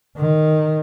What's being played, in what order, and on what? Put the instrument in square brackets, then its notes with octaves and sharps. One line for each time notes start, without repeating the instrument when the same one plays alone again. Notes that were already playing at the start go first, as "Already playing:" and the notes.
[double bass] D#3